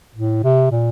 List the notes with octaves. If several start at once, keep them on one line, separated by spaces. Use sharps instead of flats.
A2
C3
A#2